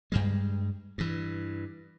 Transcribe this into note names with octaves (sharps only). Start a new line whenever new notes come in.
G2 G3 G#3
G2 E3